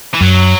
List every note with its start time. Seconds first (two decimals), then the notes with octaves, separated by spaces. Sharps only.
0.14 E3
0.21 F#2 F#3